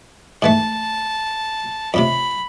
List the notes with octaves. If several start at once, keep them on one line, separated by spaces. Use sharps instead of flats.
G#2 E3 A3 A5
F2 A2 C3 B5